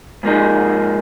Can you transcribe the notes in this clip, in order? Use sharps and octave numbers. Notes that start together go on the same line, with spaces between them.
G#2 F3 A#3 D#4 G#4